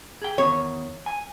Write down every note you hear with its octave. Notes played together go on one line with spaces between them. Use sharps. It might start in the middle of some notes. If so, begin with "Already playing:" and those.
G#4 G5
E2 D#3 C#5
G#5